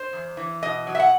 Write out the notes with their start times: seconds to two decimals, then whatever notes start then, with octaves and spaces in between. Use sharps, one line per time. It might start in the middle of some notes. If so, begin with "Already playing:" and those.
Already playing: C5
0.13 E2
0.37 E3
0.63 B2 D#5
0.87 F#3
0.95 E5
1.00 F#5